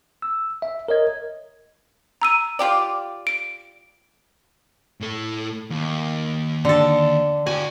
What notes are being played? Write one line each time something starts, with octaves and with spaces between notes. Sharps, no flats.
E6
E5
A#4 C#5 D#5 G#6
A#5 E6 D#7
F4 G4 D5
D7
A2 A4
D#2
D3 A4
F#4 G5 G#5